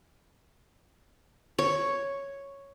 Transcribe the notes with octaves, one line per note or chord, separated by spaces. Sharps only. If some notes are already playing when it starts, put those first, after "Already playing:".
C#5